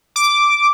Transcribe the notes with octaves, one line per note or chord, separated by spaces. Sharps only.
D6